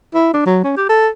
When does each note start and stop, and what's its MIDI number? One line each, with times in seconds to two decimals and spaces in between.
0.14 0.34 64
0.34 0.45 62
0.46 0.60 54
0.64 0.72 61
0.77 0.88 67
0.89 1.08 69